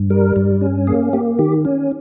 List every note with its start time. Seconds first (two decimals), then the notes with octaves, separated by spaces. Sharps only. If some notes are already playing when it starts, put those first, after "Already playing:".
Already playing: G2
0.10 G3 A#4
0.36 G2
0.61 C#4
0.87 A#3 G#4
1.13 A#3 G4
1.39 D#3 G4
1.65 C#4